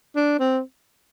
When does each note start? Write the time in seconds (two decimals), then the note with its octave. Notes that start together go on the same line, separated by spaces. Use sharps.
0.16 D4
0.40 C4